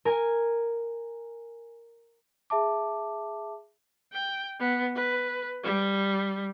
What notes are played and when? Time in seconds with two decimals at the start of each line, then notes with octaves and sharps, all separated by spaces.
0.05 A#4 G#5
2.50 G#4 E5 A5 D6
4.13 G5
4.60 B3
4.95 B4
5.64 G3